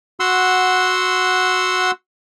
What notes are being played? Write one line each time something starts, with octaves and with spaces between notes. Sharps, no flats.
F#4 F#5 C6 E6